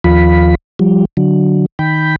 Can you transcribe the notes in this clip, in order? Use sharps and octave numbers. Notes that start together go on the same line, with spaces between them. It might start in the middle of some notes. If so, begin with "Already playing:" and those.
D#2 F3 F4 B5
F3 G3
D3 F#3
D#3 G5 B5